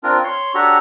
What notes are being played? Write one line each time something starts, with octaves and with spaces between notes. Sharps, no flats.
C4 D4 F4 A#4
C#5 C6
D4 F#4 G4 A4 C#5 A#5